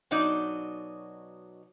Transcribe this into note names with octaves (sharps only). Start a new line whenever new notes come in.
B2 F#3 D#4 D5